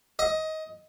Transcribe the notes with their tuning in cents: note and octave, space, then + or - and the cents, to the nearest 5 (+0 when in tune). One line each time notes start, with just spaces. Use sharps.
D#5 +20